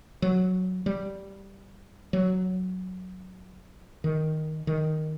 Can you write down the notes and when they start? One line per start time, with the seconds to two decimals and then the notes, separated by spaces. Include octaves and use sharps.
0.22 F#3
0.86 G3
2.13 F#3
4.04 D#3
4.67 D#3